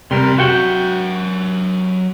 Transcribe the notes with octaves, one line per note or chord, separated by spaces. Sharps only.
F2 C3 G3 A#4 C6
F#3 F#4 E5 F#5 G5